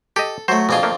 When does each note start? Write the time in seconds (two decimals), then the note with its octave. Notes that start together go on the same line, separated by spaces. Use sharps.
0.16 G4 A4 D#5
0.48 F#3 A3 C5
0.69 F2 B2 D4 F4 G#4
0.83 A3 A#3